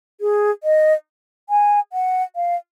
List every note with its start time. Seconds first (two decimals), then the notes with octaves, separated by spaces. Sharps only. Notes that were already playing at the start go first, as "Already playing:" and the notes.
0.21 G#4
0.63 D#5
1.49 G#5
1.93 F#5
2.36 F5